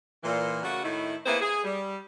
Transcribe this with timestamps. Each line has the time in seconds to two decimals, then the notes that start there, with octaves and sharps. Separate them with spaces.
0.24 A#2 E3
0.63 C#3 A3 A#3 F#4
0.83 A2 D#3 A3 D#4 E4
1.26 A#3 B3 E4 G#4 B4 C5
1.40 G#4
1.64 G3